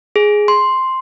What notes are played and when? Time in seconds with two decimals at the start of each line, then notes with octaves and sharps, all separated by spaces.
0.16 G#4
0.48 C6